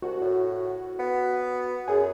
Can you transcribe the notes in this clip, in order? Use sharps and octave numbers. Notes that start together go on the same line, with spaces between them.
C2 F#4
A2
B3
F#2 G#4